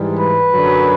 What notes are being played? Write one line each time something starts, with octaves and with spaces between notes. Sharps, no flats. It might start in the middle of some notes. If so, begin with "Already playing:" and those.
Already playing: G#2 E3 G3
B4
F#2 D3 F#3